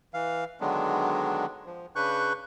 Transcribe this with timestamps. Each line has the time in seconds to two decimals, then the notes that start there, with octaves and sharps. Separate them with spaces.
0.14 E3 F5
0.61 D3 D#3 F#3 G#3 B3 D4
1.66 F3
1.96 C#3 D4 B4 C#6 F#6 G6